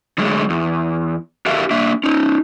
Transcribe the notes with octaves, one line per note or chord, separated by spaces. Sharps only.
D3 F#3 G#3 A3
E2
F#4 G4 A4 A#4 E5 F5
A#3 D4 E5
C#4 D#4